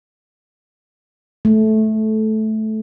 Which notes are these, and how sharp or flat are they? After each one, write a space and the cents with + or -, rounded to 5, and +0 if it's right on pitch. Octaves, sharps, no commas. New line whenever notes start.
A3 -15